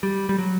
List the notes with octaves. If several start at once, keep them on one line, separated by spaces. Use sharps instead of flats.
G3
G3
F#3